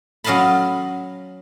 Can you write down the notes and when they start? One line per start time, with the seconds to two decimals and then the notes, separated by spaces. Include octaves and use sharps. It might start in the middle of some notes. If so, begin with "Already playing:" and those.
0.24 F#3 C#4 D#5 F5 A5 B5